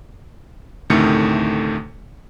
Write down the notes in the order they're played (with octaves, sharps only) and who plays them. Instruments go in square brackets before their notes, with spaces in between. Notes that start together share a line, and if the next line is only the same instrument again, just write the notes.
[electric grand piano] D2 A2 C3 D#3 A3 C#7